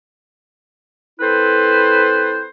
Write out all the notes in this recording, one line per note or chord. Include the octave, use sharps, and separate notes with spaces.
C4 E4 A4 B4 C5